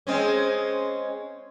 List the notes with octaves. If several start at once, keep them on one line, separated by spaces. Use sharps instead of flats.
G#3 C4 C#4